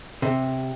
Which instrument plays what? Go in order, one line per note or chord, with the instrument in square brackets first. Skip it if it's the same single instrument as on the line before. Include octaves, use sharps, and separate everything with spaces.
[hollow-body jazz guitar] C3